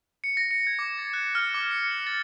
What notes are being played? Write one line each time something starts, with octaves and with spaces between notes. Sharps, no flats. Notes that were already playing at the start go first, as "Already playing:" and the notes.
C#7
A#6
C#7
G#6
D6
A6
F#6
F6
D6
C#7
F#7
A6